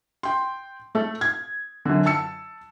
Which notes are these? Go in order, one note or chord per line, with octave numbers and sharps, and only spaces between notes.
G5 C6
A3 A4
G#6
F#2 D3
A5 E6 C#7